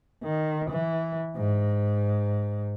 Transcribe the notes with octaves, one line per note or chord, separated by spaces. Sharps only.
D#3
E3
G#2